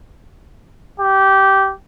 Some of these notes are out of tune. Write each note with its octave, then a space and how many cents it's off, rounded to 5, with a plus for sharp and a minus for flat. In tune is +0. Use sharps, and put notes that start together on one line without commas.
G4 -15